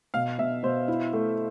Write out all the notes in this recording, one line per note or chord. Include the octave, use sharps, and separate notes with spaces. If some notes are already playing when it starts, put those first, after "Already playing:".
B2 F5
B2 E5
B2 C5
E4
A3